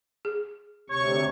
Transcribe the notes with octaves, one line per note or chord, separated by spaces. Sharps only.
G#4
D2 C3 C#5 C#6